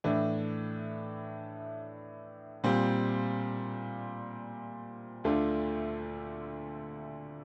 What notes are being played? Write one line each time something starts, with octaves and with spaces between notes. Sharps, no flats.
A2 E3 A3 D4
A#2 G3 C4
D2 D3 A3 D4 F4